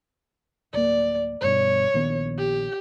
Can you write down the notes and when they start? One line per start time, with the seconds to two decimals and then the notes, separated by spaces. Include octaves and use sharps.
0.74 D1 A#3 D5
1.41 G1 G2 B2 C#5
1.94 A#1 D#3 B3
2.39 G4